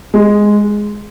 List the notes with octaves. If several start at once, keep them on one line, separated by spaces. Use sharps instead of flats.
G#3